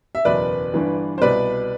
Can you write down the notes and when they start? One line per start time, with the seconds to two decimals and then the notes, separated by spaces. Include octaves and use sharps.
0.15 E5
0.25 F#1 E2 B2 B4 D5
0.74 G1 G2 E3
1.18 C5
1.22 C2 B2 B4 D5